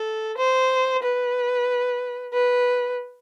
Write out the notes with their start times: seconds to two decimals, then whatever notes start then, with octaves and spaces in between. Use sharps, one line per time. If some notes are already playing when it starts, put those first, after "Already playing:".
Already playing: A4
0.38 C5
1.03 B4
2.34 B4